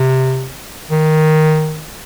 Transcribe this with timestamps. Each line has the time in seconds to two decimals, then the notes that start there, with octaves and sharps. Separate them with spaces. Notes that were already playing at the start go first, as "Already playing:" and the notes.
Already playing: C3
0.91 D#3